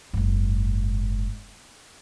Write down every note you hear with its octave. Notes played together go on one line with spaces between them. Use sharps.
F#1 G#2